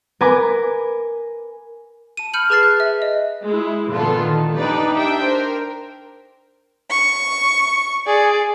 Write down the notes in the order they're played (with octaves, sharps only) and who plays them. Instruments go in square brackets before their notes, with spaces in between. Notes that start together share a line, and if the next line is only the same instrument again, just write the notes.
[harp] A#4 B4 G#5 D6
[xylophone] A5 D#7
B5 F6 G6 C#7 D#7 F#7
G#4 B4 A5 F6 A6 C7
F#6
E5
D#5
[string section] G#3 E4
A#2 D3 E3 B3 F4 A4
D#3
D4 D#4 G4 B4 D5
D4 E5 G5
A#4 C5
[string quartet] C#6
[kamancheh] G#4 D5